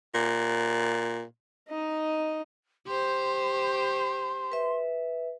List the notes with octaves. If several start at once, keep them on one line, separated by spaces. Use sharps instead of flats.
A#2
D#4 D#5
G4 C5 C6
B4 E5